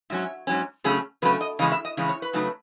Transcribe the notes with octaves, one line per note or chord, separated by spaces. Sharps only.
G#2 F#3 C#4 E5
G#2 F#3 C#4
C#3 F#3 A3 C#4 G#4
C#3 F#3 A3 C#4 B4
D#5
C#3 E3 G#3 C#4 D#5
E5
D#5
C#3 E3 G#3 C#4
C#5
B4
C#3 F#3 A3 D#4